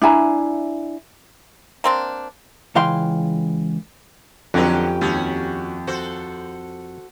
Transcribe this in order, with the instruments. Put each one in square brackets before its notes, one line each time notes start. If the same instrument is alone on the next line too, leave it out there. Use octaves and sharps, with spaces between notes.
[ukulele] D4 E4 G#5 A#5
[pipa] A#3 C4 D4
[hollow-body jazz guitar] C#2 E3 F5 G5 C6
[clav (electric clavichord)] F2 [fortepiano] D3 F#3 [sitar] C#4 G4 B4
[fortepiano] D#2 [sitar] C#4 F#4
[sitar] F#4 A4 C5